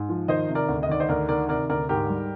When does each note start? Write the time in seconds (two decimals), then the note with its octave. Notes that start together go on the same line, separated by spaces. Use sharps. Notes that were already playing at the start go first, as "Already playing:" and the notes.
Already playing: G#2
0.09 F3
0.28 D#3 C5 D#5
0.48 C3
0.55 A#4 D5
0.68 D2
0.83 D#5
0.89 D#3 D5
1.00 C5 D#5
1.09 D2 A#4 D5
1.29 D#3 A#4 D5
1.49 C3 A#4 D5
1.69 D2 A#4 D5
1.89 G#2 G4 A#4
2.10 G3